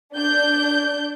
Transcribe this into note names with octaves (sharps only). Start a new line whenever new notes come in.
D4 G6